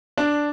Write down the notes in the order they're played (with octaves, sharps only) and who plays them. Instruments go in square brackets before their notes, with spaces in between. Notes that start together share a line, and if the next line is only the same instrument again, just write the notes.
[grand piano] D4